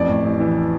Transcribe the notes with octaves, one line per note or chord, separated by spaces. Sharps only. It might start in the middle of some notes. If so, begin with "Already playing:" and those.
Already playing: A1 F2 D5
A2
A1
E3